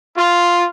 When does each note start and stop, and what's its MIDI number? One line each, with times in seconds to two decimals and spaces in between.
0.15 0.67 65